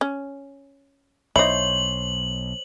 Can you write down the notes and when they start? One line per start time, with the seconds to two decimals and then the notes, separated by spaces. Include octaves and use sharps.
0.01 C#4
1.36 B1 D#4 E4 C5 C#5 F#7